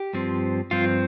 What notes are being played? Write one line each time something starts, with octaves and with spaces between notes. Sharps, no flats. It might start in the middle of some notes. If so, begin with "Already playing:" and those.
Already playing: G4
G2 F3 C4
G2 F3 C4 F4